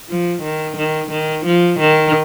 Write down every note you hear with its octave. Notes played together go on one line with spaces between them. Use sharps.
F3
D#3
D#3
D#3
F3
D#3